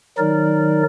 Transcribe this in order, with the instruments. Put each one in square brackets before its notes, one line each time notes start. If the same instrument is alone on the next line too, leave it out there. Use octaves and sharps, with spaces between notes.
[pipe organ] D#3 F#3 D#4 A#4 D5